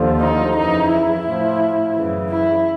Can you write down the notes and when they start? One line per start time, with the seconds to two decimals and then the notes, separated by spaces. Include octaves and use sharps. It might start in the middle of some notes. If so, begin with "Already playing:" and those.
Already playing: D#2 D3 F3
0.20 D#4
0.56 F2 C#3 E3 D#4
0.90 E4
1.26 A2 F3
1.95 F#2 C#3 E3
2.31 E4